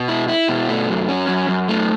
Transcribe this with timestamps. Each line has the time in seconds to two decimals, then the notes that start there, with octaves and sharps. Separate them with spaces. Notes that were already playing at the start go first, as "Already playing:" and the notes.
Already playing: B2
0.08 E4
0.28 E4
0.49 B2
0.69 A3
0.88 F#2
1.08 C#4
1.28 F#2
1.48 F#2
1.69 A3